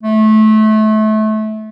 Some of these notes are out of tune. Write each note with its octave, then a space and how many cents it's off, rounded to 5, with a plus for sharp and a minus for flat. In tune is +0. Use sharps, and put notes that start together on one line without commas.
A3 -25